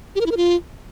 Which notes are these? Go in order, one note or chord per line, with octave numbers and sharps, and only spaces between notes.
G4
A#4
E4
A#4
F4